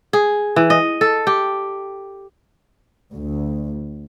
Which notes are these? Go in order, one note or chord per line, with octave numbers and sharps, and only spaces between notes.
G#4
E3
D#5
A4
G4
D2